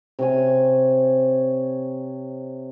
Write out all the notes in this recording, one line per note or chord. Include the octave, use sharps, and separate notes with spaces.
C3 C#5 G#5